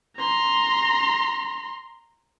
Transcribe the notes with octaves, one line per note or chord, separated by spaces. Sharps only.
A#5 C6